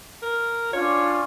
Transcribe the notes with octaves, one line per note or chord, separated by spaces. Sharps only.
A#4
C#4 D4 F4 C#5